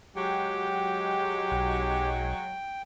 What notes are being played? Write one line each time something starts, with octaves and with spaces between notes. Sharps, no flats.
F#3 G#3 G4 G5
B1